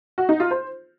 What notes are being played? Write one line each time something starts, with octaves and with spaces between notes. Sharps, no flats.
F#4
D#4
F4
C5